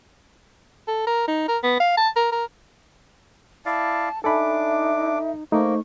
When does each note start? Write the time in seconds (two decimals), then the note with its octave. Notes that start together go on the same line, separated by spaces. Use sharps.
0.88 A4
1.07 A#4
1.28 D#4
1.48 A#4
1.64 B3
1.80 F5
1.97 A5
2.16 A#4
2.32 A#4
3.66 E4 D5 F5 A5
4.24 D4 D#4 A4 E5 G#5 B5 D6
5.52 A3 A#3 D#4 C5 C#6